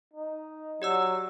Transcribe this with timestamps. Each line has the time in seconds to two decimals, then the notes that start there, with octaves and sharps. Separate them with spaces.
0.14 D#4
0.82 F#3 G4 D5 E6